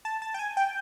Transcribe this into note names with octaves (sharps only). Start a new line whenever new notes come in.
A5
A5
G5
G#5
G5